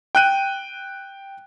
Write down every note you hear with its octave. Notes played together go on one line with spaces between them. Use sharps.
G5 F#6 D#7